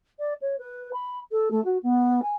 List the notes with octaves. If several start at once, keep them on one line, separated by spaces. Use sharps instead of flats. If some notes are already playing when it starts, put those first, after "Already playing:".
D5
C#5
B4
B5
A4
A3
F#4
B3
G#5